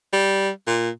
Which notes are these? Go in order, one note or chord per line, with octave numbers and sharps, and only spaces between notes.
G3
A#2